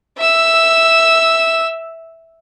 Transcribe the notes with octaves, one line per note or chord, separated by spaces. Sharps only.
E5 E6